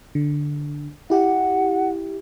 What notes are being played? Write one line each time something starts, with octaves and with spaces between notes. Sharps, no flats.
D3
E4 G4 F#5